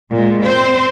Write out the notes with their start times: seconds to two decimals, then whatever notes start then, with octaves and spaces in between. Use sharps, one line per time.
0.12 A#2 G#3
0.44 C4 C5